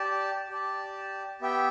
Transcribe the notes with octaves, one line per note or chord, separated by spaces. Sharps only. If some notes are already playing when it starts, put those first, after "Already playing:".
Already playing: G4 D5 A5
G4 D5 A5
B3 G4 E5 G5